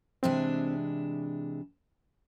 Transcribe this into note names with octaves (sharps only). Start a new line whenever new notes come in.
C3 E3 G#3 C4 D4